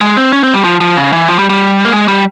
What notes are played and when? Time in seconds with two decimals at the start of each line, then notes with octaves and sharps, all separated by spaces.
0.01 G#3
0.17 C4
0.33 C#4
0.43 C4
0.54 G3
0.64 F3
0.81 F3
0.97 C#3
1.13 E3
1.28 F3
1.39 G3
1.50 G3
1.85 A#3
1.92 G#3
2.08 G3